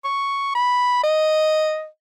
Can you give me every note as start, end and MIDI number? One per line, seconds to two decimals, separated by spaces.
0.04 0.54 85
0.55 1.01 83
1.04 1.86 75